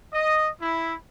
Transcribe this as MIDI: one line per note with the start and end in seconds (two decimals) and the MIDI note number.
0.14 0.49 75
0.61 0.95 64